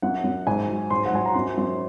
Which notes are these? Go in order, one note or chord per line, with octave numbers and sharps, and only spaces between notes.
F#2 F#5
F#2
G#2 G#5
F#3
G#2 C6
F#5
F#3 G#5
A#5
F#2 C6
F#2